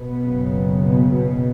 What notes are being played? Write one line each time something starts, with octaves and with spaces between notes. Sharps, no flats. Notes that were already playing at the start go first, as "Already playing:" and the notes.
Already playing: B2 B3
F#1 F#2 C#3
B2 B3
B2 B3